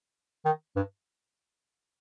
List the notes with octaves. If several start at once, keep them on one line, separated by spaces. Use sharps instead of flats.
D#3
G2